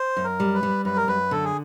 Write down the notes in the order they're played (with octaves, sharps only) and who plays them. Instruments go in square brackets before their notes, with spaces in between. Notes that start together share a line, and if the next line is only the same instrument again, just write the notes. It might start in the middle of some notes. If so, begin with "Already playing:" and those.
Already playing: [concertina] C5
[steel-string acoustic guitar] F#2
[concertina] A#4
[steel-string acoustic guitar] G3
[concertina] B4
[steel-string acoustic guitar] G3
[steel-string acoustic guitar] F#2 [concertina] B4
[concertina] A#4
[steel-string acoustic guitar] F#2 [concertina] B4
[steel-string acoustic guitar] D3 [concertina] A4
[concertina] G#4